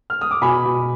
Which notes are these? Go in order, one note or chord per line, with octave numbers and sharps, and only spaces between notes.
F6
D#6
D6
B2 G#5 B5
B2